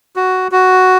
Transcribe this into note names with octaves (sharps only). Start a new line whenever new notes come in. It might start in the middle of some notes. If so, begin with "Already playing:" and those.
F#4
F#4